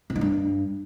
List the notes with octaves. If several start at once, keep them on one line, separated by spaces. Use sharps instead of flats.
B2
G#2
G2